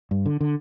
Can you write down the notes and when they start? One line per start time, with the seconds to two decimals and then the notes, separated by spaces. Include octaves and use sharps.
0.11 G2
0.26 D3
0.41 D3